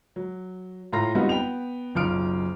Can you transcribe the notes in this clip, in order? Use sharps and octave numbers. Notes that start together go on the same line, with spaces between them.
F#3
A2 F4 A#5 C6 A#6
G3 B3 C4 D#4 F4 F#4
B3 G5 F7
F#1 B1 F4 F6 D7